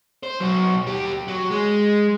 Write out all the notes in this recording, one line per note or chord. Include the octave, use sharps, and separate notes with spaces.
C5
B2 F#3
D#2 G4
F#3
G#3